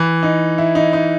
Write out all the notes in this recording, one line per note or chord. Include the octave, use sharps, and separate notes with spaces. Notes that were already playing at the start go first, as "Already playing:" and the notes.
Already playing: E3
D#4
E4
D#4
D#4